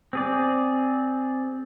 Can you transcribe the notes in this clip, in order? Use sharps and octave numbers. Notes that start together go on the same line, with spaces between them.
C4 G#4 D5